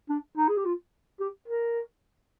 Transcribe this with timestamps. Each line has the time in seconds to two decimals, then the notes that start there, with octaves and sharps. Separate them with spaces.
0.10 D4
0.38 D#4
0.49 G#4
0.57 G4
0.65 F4
1.20 G4
1.48 A#4